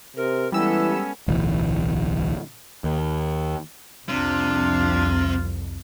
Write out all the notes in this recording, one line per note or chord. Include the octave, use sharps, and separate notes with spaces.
C3 A#4
E3 G3 G#3 B3 C#4 A4 E6
D1 B1 E3
D#2
C2 F2 C3 D4 F4